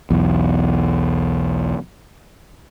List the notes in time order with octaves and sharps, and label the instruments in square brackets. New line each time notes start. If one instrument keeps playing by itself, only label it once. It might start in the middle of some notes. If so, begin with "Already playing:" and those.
[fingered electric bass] B1 E2